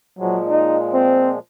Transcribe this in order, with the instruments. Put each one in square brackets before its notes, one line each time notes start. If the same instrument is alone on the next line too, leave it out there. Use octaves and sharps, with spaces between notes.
[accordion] A#2 F3 G#3 [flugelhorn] F#3
[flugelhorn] D#4
C4